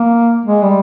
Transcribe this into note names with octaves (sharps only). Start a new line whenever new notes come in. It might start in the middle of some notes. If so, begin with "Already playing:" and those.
Already playing: A#3
G#3
G3